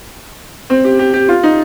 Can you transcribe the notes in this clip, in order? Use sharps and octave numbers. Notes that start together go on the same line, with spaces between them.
C4
G4
G4
G4
F4
D#4